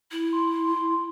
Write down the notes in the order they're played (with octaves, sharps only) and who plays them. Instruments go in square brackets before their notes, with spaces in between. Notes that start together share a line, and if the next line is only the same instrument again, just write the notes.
[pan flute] E4
[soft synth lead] C6